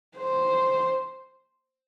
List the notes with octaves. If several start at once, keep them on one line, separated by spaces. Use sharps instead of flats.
C5